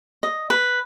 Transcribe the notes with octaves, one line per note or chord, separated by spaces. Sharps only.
D#5
B4